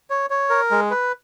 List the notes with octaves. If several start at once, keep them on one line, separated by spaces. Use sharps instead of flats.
C#5
C#5
A#4
G#3
B4